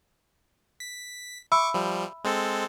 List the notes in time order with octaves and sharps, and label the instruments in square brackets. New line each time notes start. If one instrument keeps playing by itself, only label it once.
[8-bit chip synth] B6
[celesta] E5 B5 E6 [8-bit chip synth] C#6 D6
[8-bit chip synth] F3 G3
G#3 C4 A4